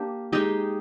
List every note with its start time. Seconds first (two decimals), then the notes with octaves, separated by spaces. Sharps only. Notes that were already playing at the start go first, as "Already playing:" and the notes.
Already playing: A#3 D4 G4
0.32 G#3 D#4 G4